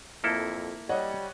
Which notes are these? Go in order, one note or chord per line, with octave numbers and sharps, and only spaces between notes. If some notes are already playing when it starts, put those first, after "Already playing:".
F2 A#3 E4 A4
G3 C#5 D#5 F#5